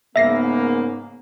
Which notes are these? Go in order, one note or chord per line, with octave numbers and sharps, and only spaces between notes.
G#2 C#3 A#3 B3 E5 A#6 C7